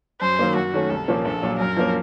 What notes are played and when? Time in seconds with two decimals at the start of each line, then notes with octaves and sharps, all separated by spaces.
0.21 F#2 C5
0.39 D#3 F#3 A#3
0.56 F#2 F#4
0.74 D#3 A3 C#4
0.90 C2 A4
1.08 A#2 F3 A#3 C#4
1.25 A#1 A4
1.42 A#2 F#3
1.59 F#2 A#4
1.77 F3 A#3 C#4